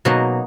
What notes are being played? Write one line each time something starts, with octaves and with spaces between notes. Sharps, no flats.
B2 F#3 A#3 D#4